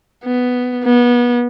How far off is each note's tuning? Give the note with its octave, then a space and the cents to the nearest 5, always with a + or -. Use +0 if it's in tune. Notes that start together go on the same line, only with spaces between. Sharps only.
B3 +5
B3 -30